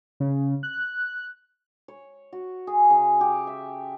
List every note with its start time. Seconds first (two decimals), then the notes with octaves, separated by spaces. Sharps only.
0.20 C#3
0.63 F#6
1.88 C#5
2.33 F#4
2.67 G#4
2.90 C#3
3.21 G4
3.47 E5